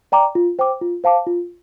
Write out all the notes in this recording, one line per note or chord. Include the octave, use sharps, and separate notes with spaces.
D5 G5 A#5 D6
F4
C5 G5 D6
F4
C5 F5 A5 D6
F4